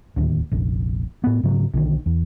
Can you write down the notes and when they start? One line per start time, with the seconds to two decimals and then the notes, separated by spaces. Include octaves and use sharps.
0.16 D1 D#2
0.52 F1 A#1
1.24 A2 B3
1.43 G#2 C#3 F#3
1.74 B1 D3 D#3
2.06 E2